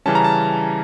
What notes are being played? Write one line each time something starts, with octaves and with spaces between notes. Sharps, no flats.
C#3 E3 G3 C#4 A5
A#5
A5